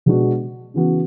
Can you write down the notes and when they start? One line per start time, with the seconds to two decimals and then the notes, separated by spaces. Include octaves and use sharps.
0.06 B2 G#3 B3 D4 F#4
0.74 C#3 E3 B3 F#4